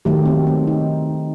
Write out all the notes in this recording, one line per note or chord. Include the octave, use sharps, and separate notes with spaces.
D#3 F#3 A3 G4
C4
C4
D#4